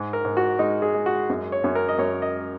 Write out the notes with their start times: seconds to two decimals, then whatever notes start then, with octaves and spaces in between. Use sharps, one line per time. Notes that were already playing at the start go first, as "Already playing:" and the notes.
Already playing: G#2
0.13 A#4
0.25 G#2
0.37 F#4
0.59 G#3 D#4
0.82 G#4
0.94 G#3
1.06 F#4
1.30 F#2
1.52 C#5
1.64 F#2
1.75 A#4
1.89 D#5
1.99 F#2 C#5
2.22 D#5